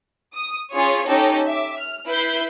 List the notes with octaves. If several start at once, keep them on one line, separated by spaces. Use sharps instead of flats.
D#6
C#4 F4 G#4 C#5
C#4 D#4 G4 A4
E5 D6
F6
E4 B4 G6 C7